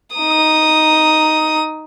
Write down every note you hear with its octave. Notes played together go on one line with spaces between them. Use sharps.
D#4 D#6